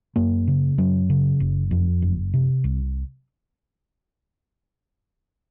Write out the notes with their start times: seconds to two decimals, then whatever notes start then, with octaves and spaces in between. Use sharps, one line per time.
0.16 F#2 A#3
0.48 C#3
0.78 F#2 F#3
1.10 C#3
1.40 F#1
1.71 F2
2.02 F#1
2.34 C3
2.64 C2